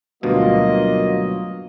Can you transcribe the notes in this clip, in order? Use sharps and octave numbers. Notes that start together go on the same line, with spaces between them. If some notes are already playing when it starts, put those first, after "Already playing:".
D2 G2 B2 F#3 A#3 F4 D#5